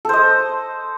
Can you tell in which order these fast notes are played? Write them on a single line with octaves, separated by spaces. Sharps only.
A4 C5 D#5